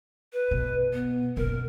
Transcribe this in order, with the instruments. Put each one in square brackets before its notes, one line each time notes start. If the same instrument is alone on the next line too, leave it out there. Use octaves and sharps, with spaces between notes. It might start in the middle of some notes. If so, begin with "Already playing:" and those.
[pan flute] B4
[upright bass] B2
[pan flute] B3
[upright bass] F#1 B2 [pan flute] A#4